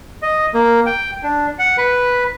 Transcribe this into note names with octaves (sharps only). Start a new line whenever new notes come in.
D#5
A#3
G5
D4
F#5
B4